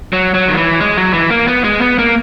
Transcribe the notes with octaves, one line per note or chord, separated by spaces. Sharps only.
F#3
F#3
D#3
E3
G#3
F#3
E3
A#3
B3
G#3
B3
A#3